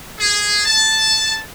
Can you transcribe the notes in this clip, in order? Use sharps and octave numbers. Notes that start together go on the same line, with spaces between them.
G#4
A5